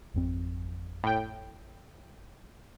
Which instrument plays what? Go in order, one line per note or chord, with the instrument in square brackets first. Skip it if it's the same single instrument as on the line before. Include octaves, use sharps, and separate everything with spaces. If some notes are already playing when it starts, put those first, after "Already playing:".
[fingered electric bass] G#1 F2 C4
[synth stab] A2 G5